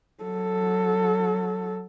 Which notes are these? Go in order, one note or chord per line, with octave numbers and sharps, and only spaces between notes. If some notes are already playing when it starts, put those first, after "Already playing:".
F#3 A4